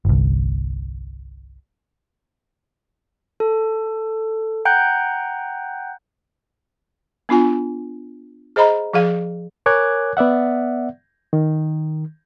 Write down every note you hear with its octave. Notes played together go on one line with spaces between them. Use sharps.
G1 C2
A4
F#5 G5 A#5 F#6 G6
B3 D4 F4 G#5
G#4 C5 D#5 A#5 B5
F3 G#4 F5
A#4 C#5 G#5 D6 F#6 G#6
B3 D5 E5 F#5
D#3